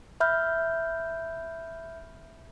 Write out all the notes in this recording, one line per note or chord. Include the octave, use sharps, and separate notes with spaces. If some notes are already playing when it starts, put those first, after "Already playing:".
E5 B5 F6 G6